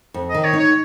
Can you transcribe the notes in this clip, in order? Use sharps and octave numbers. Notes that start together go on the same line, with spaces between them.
F2
D#5
D#3
C#5
D#4
C#5